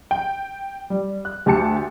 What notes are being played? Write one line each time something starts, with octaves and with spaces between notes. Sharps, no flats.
G5
G3
F#6
D2 G4 A5 C#7